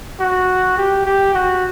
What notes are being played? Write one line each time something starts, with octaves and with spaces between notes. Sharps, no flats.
F#4
G4
G4
F#4